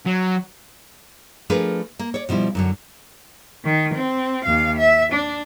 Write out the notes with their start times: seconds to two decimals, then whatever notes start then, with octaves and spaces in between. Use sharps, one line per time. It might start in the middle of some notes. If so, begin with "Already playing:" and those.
0.06 F#3
1.50 F3 A3 D4 G#4 A#4 B4
1.99 A#3
2.14 C#5 D5
2.29 B2 F3 G3 E4
2.55 F#2 D3 F#3
3.65 D#3
3.95 C4
4.45 D#2 F5
4.79 E5
5.13 D4